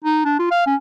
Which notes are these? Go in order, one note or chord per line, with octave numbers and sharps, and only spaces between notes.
D#4
D4
F4
F5
C#4